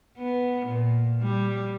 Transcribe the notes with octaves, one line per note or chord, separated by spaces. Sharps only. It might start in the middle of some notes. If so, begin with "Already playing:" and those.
B3
A#2
G3